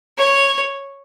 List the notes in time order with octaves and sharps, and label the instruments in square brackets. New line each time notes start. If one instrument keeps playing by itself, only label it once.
[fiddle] C#5